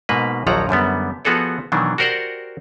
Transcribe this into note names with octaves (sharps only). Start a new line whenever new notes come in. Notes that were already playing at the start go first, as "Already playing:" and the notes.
G#2 B2 A#3 B4
A#1 D#2 F3 F#3 F#5 A#5
F#2 D3 G3 B3
F3 B3 F#4 G#4 A4 D5
B2 D#3 E3 F#3 D4
F#4 G4 A#4 C5 D5 F#5